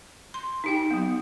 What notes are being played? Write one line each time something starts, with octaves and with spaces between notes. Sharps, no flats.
C6
D#4 G4 G5
F#3 B3